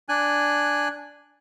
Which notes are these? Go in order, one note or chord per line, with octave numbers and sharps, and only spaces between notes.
D4 G#5 F#6